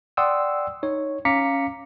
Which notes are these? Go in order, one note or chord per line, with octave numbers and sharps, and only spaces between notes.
D5 F#5 G5 C6 D#6 E6
D#4 C#5
C#4 F5 A#5 D6 B6 C#7